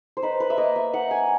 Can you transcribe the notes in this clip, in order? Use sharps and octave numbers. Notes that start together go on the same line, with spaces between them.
C5
D#4 B4
B4
E5
A#3 D#5
E5
D#4 F#5
G#5